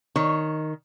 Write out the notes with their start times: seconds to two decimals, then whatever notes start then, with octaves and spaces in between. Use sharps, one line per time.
0.16 D#3 C#5